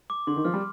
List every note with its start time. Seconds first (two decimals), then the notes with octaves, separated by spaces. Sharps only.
0.10 D6
0.27 D3 C6
0.36 D#3
0.45 F3 F6
0.54 G3